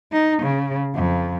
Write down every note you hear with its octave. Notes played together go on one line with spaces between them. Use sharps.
D#4
C#3
F2